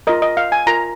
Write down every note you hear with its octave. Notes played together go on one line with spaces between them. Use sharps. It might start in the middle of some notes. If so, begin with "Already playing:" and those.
F4 A#4 D#5
D#5
F5
G#5
F4 A#4 A#5